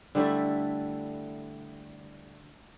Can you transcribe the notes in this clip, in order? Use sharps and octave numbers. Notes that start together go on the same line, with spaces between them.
D3 G3 A3 E4